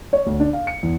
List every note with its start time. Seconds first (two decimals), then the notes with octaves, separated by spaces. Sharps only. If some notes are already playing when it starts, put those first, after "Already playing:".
0.13 C#5
0.26 D2
0.40 D4
0.53 F5
0.67 C#7
0.83 E2